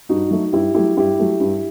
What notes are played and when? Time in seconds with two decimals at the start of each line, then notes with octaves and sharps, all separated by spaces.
0.09 G2 D#4 F#4
0.31 F#3 A3
0.53 G2 E4 G4
0.74 F#3 A3 E4 G4
0.97 G2 E4 G4
1.19 F#3 A3
1.40 G2